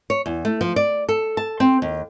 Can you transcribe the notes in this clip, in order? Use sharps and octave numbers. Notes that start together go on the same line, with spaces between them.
C#5
E2
A3
F3
D5
A4
A5
C4
D#2